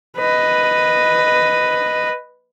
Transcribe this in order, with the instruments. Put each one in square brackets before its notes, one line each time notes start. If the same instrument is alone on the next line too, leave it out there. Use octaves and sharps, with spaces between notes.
[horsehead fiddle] B4 D#5